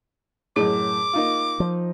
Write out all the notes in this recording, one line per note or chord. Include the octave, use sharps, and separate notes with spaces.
F#2 A2 G#4 D#5 D6
A#3 D#4 F4
F3